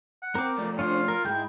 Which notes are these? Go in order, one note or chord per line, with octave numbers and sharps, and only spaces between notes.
F#5
C4 A#4 D6
F3 A3 D5
C#4 D4 F4 C5
A#4
C#2 G#2 G#3 E4 G5